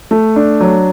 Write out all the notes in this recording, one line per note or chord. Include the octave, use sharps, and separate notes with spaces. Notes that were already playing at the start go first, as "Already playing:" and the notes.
A3
D4
F#3